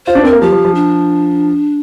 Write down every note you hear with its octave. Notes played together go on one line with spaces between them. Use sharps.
F4 C5
D4
C4 A#4
A#3
F3 G4
F3
F3
D4